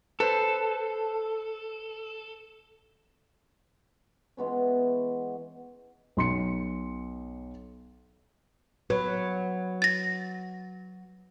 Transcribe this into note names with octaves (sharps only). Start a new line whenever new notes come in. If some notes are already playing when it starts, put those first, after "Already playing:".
A4 B4 C5
E3 G#3 B3 C#4
B1 C6 C#7
F#3 B4
A6 A#6